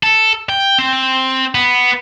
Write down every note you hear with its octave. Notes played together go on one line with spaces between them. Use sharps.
A4
G5
C4
B3